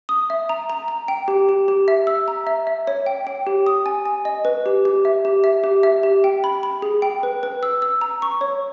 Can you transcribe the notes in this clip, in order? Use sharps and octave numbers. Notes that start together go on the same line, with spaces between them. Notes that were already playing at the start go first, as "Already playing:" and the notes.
D#6
E5
A#5
A#5
A#5
G5
G4
G4
G4
E5
E6
A#5
E5
E5
C#5
G5
G5
G4
D#6
G#5
G#5
D#5
B4
G4
G4
E5
G4
E5
G4
E5
G4
G5
B5
B5
G#4
G5
B4
B4
E6
E6
A#5
C#6
C#5